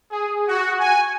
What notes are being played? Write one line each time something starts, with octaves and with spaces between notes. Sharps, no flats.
G#4
F#4
G#5